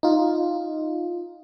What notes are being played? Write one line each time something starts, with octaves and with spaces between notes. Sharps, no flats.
D#4 F4